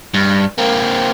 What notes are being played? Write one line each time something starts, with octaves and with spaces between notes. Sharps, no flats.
G2
A#3 C4